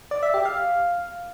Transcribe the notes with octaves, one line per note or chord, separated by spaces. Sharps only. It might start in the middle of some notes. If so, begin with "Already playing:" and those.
D5
E5
G4
F5